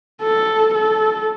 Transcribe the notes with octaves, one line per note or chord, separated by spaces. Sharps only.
A4
A4